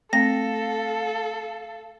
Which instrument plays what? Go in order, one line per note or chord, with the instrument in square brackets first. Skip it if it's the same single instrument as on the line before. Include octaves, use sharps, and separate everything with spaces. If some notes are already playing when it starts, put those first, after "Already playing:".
[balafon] A3 C4 [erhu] A4 [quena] F5 [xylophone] A#6